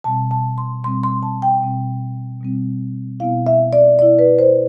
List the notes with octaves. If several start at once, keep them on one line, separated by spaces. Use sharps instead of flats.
B2 G3 C4 A5
A5
C6
B2 G3 C4 C6
C6
A5
G5
B2 G3 C4
B2 G3 C4
B2 B3 E4 F5
E5
D5
B2 B3 E4 D5
B4
C5